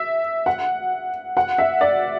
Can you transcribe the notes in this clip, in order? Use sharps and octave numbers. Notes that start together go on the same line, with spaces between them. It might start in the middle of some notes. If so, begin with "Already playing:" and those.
Already playing: E5
F#5
F#5
E5
D5